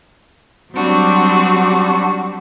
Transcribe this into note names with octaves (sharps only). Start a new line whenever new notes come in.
F#3 G3 C4 D4 F#4